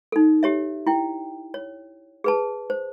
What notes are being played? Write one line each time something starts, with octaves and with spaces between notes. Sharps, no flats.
D#4 A4
G4 C#5 E5
E4 G5
C#5
G#4 B4 A5
C5